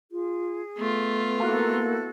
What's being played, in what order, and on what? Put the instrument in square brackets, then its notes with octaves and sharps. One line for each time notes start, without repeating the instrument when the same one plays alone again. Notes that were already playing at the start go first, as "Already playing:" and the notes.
[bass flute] F4 [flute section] G#4
[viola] A3 F4 [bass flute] B3
[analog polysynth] A#3 [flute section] E4 F#4 A4